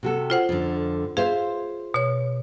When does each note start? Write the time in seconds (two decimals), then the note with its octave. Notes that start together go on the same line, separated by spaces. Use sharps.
0.03 C3 F#4 A4
0.30 F4 C5 F#5
0.49 F2 D3
1.17 F4 G#4 C5 E5 F5
1.94 B2 C#5